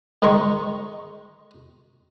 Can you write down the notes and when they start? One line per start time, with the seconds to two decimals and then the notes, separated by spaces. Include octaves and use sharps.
0.22 G#2 D#3 D#4 C6 C#6